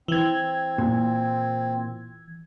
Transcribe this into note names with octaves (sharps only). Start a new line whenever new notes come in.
E3 C4 G#6
A#2